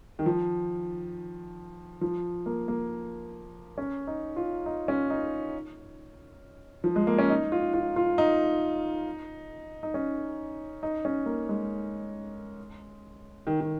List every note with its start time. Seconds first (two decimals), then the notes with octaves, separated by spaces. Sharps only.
0.19 D#3
0.26 F3
2.01 F3
2.46 A#3
2.68 A#3
3.78 C#4
4.07 D#4
4.36 F4
4.66 D#4
4.88 C#4
5.10 D#4
6.84 F3
6.96 G#3
7.07 A#3
7.18 C#4
7.30 D#4
7.52 F4
7.74 F4
7.96 F4
8.18 D#4
9.83 D#4
9.94 C#4
10.83 D#4
11.05 C#4
11.26 A#3
11.49 G#3
13.47 D#3
13.60 D#3